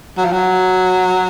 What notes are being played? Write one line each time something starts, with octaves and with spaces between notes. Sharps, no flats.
F#3
F3
F#3